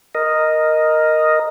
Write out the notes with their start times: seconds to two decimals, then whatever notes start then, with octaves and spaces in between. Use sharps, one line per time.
0.15 A#4 D#5